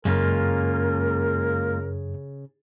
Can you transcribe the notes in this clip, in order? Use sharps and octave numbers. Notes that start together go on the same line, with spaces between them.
F#2 C#3 G#3 A#3 F4 A#4